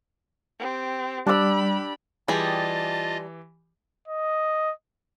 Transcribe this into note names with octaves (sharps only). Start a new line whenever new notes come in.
C4 G4
G3 D4 G4 B5 E6
E3 G3 F4 G4 G#4 D#5 A5
D#5